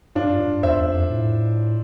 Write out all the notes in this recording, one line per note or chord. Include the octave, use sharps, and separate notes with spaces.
G2 D4 F4
G2
E2 C5 E5
E2
F2
A2